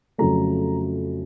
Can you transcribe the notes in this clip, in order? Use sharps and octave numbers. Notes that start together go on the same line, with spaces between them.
F2 C#3 F#3 A3 A#5